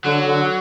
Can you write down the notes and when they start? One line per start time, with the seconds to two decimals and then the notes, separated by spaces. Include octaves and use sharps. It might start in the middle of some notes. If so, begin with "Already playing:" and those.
0.04 D3 F#3
0.26 D3